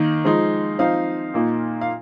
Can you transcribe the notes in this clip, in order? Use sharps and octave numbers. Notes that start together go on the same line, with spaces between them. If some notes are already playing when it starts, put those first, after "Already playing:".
Already playing: D#3 A#3 D#4
F3 G#3 D#4
F3 C4 D#4 F5
A#2 A#3 D#4
F5